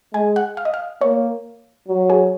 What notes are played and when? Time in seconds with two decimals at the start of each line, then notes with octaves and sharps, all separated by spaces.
0.13 G#3 G#5
0.36 F#5
0.57 F5
0.65 D#5
0.74 F5
1.01 A#3 C#5
1.88 F#3
2.10 G#4